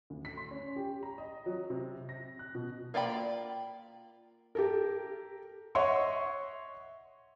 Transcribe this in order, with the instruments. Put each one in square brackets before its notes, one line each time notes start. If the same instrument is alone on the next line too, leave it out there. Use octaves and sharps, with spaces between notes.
[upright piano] D2
B6
C6
C#4
G4
A#5
D#5
F#3
C3
A#6
F#6
B2
[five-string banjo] A#3 F4 D5 G5 B5
[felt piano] G4 A4 A#4
C#5 D#5 E5 F#5 C6 C#6